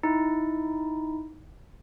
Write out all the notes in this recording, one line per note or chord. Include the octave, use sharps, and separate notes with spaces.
D#4 E4